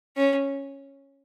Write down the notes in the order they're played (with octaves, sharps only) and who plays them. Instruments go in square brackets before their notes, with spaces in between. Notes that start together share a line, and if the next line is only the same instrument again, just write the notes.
[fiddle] C#4